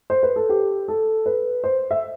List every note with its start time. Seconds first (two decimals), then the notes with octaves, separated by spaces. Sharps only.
0.10 C5
0.23 B4
0.36 A4
0.49 G4
0.88 A4
1.26 B4
1.64 C5
1.91 E5